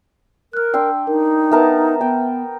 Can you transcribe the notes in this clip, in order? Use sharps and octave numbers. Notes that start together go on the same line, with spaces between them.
A#4 F6 F#6
D4 G5 C6 E6
D#4 A#4
B3 A#4 B4 E5 A5
B3 G5